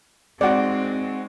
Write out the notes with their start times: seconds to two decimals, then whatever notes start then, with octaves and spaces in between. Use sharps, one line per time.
0.41 G#3 C4 D#4 F#4 D5